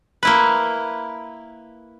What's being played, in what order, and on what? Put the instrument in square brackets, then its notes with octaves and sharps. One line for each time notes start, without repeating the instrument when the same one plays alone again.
[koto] A#3 E4 B4